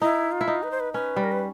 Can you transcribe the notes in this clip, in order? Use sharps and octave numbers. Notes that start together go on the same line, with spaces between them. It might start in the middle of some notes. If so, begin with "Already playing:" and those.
D#4 E4
F4
E4
D#4
B4
C5
B4
C#4 B4
G3
A#4
B4